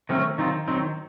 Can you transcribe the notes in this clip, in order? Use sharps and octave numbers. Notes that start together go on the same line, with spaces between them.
D#3 F#3 A3 C4 C#4
D#3 F#3 C4 D#4 F4
D#3 F#3 C4 D#4